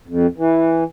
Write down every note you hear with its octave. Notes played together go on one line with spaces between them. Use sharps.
F2
E3